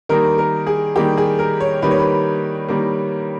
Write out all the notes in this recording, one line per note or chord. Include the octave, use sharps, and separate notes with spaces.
D#3 G3 A#3 A#4
A#4
G#4
D#3 G3 A#3 G4
G#4
A#4
C#5
D#3 G3 A#3 B4
C#5
B4
D#3 G3 A#3